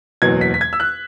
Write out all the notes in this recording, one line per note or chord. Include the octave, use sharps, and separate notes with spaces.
F#1 E2 B2 F#3 G#6
B6
B6
G#6
E6
F#6